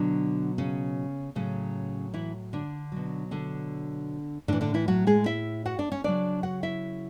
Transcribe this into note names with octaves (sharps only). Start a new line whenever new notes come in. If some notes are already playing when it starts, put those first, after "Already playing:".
Already playing: B2 D3 F#3 D4
C#3 C#4
A2 C#3 F#3 C#4
E3 E4
D3 D4
B2 F#3
D3 D4
A2 D3 E3 D4
D3 D4
E3 E4
F#3 F#4
G#3 G#4
E4 E5
F#4 F#5
D4 D5
C#4 C#5
C#3 F#3 D4 D5
F#4 F#5
E4 E5